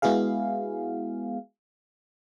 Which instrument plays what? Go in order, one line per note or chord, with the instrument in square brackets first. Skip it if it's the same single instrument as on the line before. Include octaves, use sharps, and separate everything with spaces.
[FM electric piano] G#3 B3 E4 F#4 G#4 F5